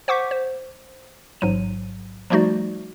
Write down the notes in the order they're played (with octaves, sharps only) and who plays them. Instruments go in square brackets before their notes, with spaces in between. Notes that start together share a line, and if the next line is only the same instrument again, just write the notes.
[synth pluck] C5 F#5 C#6 D6 G6 B6
C5
A1 G#2 F#3 D#7
F3 G3 A3 D#4 F#4 D5